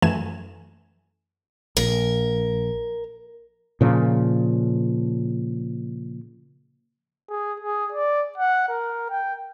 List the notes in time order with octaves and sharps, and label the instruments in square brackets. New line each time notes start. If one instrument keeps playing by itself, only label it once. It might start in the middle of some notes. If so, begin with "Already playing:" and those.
[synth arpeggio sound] F#2 E3 A3 G#5 E7
[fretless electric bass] A#1 [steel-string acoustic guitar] A#4
[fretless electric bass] A#2 C#3 F3
[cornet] G#4
G#4
D5
F#5
A#4
G5